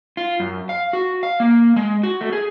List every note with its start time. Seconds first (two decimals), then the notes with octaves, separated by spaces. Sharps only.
0.17 F4
0.40 F#2
0.69 F5
0.93 F#4
1.23 F5
1.40 A#3
1.76 G#3
2.03 F#4
2.21 A3
2.32 G#4